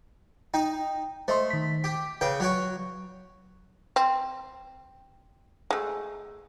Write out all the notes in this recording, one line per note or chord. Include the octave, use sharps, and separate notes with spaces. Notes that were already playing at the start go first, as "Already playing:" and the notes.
D#4 G5
A3 C5 D#5 C6
D#3 B6
G4
C#3 B4 G5
F#3 F#4 C#5
C4
G#3 A3